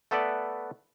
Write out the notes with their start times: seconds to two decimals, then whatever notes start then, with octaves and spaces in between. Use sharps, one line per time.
0.11 A3 B3 A4 B4 D5